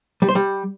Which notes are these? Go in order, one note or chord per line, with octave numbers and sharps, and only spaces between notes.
G3
C5
G3